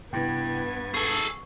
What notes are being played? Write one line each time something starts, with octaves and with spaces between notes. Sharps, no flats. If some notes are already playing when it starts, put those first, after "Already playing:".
G2 C3 B3 E4 G5 G#6
G#4 A4 C#6